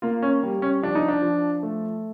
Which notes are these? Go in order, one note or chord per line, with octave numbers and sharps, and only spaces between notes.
A#3 F4
C#4
G3
C#4
F3 D4
D#4
D4
F3
A3